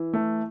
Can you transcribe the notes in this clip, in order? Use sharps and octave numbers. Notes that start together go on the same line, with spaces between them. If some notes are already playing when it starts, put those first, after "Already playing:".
Already playing: E3
A3